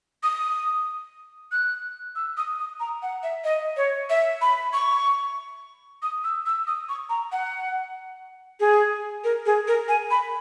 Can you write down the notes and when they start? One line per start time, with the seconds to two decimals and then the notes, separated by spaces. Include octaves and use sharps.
0.23 D#6
1.52 F#6
2.16 E6
2.37 D#6
2.59 D#6
2.80 A#5
3.02 F#5
3.23 E5
3.44 D#5
3.77 C#5
4.10 E5
4.41 B5
4.73 C#6
6.03 D#6
6.24 E6
6.46 E6
6.67 D#6
6.89 C#6
7.10 A#5
7.32 F#5
8.60 G#4
9.24 A#4
9.46 G#4
9.68 A#4
9.89 G#5
10.11 B5